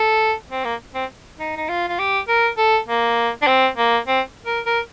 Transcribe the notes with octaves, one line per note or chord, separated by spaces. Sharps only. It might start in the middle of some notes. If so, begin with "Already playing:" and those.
Already playing: A4
C4
A#3
C4
D#4
D#4
F4
F4
G4
A#4
A4
A#3
D4
C4
A#3
C4
A#4
A#4